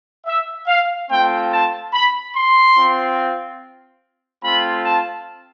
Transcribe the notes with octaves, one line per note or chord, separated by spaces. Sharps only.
E5
F5
A3 C4 F4 G5
A5
B5
C6
C4 F4
A3 C4 F4 B5
A5